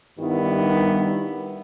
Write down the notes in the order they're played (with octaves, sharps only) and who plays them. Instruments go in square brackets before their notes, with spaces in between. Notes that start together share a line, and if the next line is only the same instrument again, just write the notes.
[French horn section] G2 D#3 G3 B3 E4